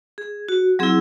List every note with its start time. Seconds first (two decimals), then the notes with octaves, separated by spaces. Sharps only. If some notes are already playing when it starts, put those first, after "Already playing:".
0.18 G#4
0.49 F#4
0.79 F#3 C4 E4 G#4